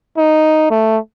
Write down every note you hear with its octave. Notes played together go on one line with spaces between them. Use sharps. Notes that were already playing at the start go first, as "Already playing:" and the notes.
D#4
A3